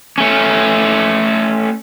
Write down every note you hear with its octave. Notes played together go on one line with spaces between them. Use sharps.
A3 C#4